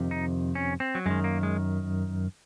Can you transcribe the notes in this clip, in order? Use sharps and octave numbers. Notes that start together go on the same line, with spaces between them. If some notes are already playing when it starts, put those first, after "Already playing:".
Already playing: F2 C3 D#3
D#4
C#4
C4
F#3
F#2 D#3 G#3
A#3
G#3